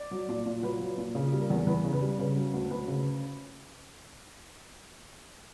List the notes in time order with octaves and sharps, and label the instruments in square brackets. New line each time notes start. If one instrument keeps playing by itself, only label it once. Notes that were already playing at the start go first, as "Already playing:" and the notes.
Already playing: [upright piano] D5
F#3
A#2
A#2
F#3 B4
F#3
A#2
C#3
G3
A#4
E2
E2 B4
C#3
B4
G3
C#3 B4
F#3
D2
D2 B4
C#3